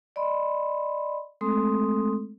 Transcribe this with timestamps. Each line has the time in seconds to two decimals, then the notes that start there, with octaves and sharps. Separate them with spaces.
0.16 D5 D#5 B5 C6
1.41 G#3 A3 C4 A4 C6 D#6